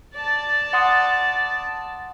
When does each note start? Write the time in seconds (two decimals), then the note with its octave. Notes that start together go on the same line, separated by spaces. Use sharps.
0.15 D5 A5
0.73 F#5 C6 D#6